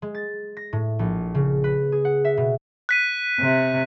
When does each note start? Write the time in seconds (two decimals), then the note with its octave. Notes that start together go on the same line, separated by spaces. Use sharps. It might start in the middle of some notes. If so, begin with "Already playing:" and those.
0.02 G#3
0.15 A6
0.57 A#6
0.73 A2
0.99 A#1
1.35 C#3
1.64 B4
1.92 G#4
2.05 F#5
2.25 E5
2.37 B2
2.89 F#6 B6 D#7
3.40 C3